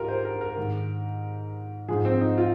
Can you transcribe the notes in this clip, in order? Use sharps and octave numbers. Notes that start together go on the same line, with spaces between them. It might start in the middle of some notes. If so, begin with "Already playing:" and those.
Already playing: G#2 F4 G4 A#4
C5
A#4
A#4
G#2 D#3
G#2 F3 G#4
C4
D#4
F4